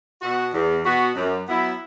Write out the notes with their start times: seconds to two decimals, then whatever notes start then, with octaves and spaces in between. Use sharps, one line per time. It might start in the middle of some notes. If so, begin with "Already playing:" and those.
0.22 B2 B3 F#4
0.53 E2
0.84 B2 B3 F#4
1.15 F#2
1.47 F#3 B3 E4